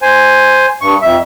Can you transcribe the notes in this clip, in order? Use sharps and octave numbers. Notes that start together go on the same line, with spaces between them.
C5 G#5
G2 C#6
F2 E5